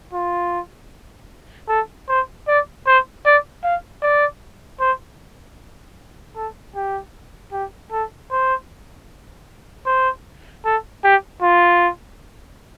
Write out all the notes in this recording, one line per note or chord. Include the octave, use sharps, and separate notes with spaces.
F4
A4
C5
D5
C5
D5
F5
D5
C5
A4
G4
G4
A4
C5
C5
A4
G4
F4